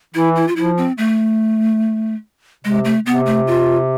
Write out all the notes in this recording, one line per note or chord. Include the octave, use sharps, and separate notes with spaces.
E3 E4
E4
F4
F3 E4
C4
A3
C3 G#3
A3
C3 B3
A3
F4